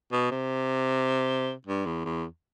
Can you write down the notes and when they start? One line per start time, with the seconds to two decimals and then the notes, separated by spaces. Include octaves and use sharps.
0.12 B2
0.31 C3
1.67 G2
1.86 E2
2.05 E2